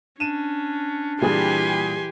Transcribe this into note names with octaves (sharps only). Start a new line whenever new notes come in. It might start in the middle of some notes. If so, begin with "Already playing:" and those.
C#4 D4 D#7 E7
A#2 E3 G3 G4 G#4 G#5 C6